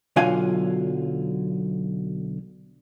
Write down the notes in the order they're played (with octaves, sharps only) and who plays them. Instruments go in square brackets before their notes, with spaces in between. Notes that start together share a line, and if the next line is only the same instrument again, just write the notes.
[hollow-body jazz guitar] B1 D3 F#3 F4 F5 G#5